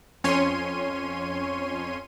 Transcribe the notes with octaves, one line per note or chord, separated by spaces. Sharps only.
F2 C#4 C#5 C6 D#7